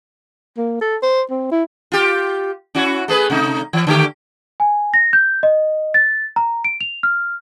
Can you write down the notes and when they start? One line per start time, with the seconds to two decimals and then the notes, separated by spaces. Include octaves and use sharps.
0.57 A#3
0.81 A4
1.02 C5
1.30 C4
1.51 E4
1.92 F4 G4
2.75 C#4 E4 F#4
3.08 A3 G#4 B4
3.30 C3 A3 D#4
3.73 E3
3.87 D3 A3 G4
4.60 G#5
4.94 A#6
5.13 G6
5.43 D#5
5.94 A6
6.36 A#5
6.64 D7
6.81 F7
7.03 F6